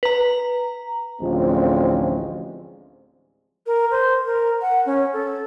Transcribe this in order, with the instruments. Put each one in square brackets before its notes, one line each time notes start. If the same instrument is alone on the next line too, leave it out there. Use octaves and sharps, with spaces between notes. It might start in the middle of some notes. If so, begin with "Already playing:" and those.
[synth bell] B4 A#5
[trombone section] A1 D2 F3 G#3 C4 F4
[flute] A#4
C5
A#4
F#5
C#4
A4